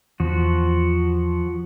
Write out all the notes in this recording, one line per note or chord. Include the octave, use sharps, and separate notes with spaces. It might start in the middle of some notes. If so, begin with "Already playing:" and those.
E2 F3 F#4